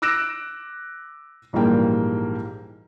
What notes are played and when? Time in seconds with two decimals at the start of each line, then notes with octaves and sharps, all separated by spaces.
0.02 D6 E6 F#6 A#6 D7 E7
1.53 A#1 G#2 E3 G3 A#3 G5